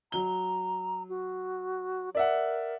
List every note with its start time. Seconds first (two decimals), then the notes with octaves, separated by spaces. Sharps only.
0.12 F#3 A#5 G7
1.09 F#4
2.15 A#4 D5 E5 F#5